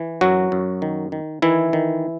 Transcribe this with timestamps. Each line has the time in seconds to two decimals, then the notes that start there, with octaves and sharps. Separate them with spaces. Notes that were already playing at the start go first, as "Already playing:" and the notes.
Already playing: E3
0.21 F#2 F#3 F#4
0.52 F#2
0.82 D#3
1.12 D#3
1.42 D#3 E3 E4
1.73 D#3